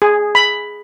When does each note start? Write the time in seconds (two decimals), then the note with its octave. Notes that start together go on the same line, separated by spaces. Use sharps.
0.02 G#4
0.35 B5